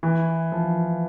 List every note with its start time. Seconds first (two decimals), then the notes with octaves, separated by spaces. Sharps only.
0.03 E3
0.52 F3